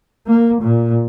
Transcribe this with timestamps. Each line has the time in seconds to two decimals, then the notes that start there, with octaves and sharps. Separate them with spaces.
0.27 A#3
0.62 A#2